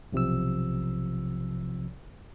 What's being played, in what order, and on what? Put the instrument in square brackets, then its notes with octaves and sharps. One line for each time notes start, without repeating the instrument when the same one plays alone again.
[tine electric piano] B1 C3 F3 E6